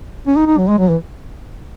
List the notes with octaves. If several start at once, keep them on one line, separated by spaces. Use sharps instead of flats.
C#4
D#4
D#4
F#3
G#3
F#3
E3